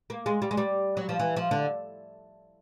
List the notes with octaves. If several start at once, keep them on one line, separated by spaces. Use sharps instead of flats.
A#3
G#3
G3
G#3
G3
F#3
F3
E3
F3
D3